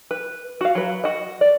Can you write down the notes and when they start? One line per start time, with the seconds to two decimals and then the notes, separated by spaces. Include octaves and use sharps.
0.11 B4
0.61 F#4 F5
0.75 F#3 B4
1.04 F#4 D#5
1.41 D5